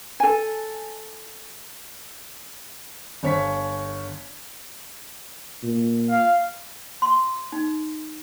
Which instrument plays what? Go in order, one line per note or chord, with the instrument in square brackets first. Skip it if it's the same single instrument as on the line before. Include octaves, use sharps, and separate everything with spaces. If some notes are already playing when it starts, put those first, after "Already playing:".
[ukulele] A4 G#5
[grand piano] G1 C#5 B6
[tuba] A#2
[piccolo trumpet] F5
[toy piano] C6
D#4